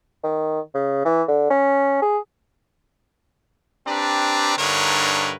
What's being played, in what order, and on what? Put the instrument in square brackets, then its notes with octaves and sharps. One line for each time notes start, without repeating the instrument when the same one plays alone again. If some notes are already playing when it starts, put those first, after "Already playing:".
[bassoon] D#3
C#3
E3
D3
C#4
G#4
[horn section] C4 D4 G4 B4 D5 A#5
G2 D3 D#4 A#4 B4 C#5